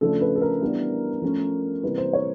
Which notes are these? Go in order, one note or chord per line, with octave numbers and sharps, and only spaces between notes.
C#3 F3 A3 D4 A4
B4
A4
A#4
E3 G3 B3 D4
F3 A3 C#4
C3 E3 G3 A#3 B4
C5
C#5